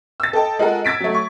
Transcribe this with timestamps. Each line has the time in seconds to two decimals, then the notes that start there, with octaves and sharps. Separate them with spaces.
0.20 E6 A6
0.33 A4 D#5 G5 A5
0.59 G#3 F4 A4 A#4 F#5
0.85 E6 G#6 A6 B6 D7
1.00 F#3 A3
1.15 C#6